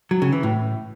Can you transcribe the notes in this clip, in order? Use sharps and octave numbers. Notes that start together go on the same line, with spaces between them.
F#3
C#3
E3
A2